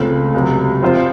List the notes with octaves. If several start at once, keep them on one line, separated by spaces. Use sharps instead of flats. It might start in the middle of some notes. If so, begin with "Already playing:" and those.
Already playing: C#2 C#3 A3 C4 F4
C#2 C3 F#3
F3 C4 F4 C5